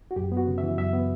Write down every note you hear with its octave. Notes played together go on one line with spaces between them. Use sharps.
F#4
F#2 G4
B3
F#4
C#3
E5
E3
F#2 E5
B3